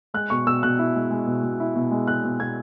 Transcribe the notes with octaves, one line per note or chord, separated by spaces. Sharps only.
G#3 F#6
B2 C#6
B2 E6
B2 F#6
E4
G#3
G#3
B2
B2
E4
B2
G#3
B2 F#6
B2
B2 G#6